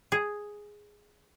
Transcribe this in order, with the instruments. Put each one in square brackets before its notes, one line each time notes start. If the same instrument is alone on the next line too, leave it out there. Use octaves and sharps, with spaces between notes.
[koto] G#4